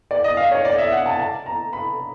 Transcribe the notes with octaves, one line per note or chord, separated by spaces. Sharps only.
D5
D#5
F5
C#5
D5
E5
F#5
A5
A5
A#5
B5